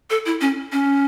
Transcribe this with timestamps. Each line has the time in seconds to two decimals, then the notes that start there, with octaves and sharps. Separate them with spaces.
0.10 A4
0.26 E4
0.41 C#4
0.72 C#4